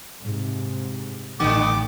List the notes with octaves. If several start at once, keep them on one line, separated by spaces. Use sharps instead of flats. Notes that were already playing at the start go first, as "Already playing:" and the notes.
G#2 C3
A1 G2 D3 B3 D6